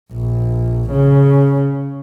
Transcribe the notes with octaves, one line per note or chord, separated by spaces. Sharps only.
A#1
C#3